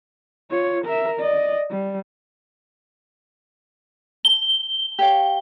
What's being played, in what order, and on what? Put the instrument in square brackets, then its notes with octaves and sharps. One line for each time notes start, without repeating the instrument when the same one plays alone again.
[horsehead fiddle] F4 C#5
A#4 E5
D5 D#5
G3
[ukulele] A5 [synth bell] G7
[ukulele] G4 C#5 F5